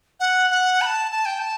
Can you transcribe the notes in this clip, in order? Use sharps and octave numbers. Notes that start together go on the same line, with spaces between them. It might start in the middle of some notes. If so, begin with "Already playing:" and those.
F#5
F#5
B5
A5
A5
G5
A5